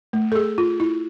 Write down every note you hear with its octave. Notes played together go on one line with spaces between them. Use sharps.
A3
A4
G#4
F4
E4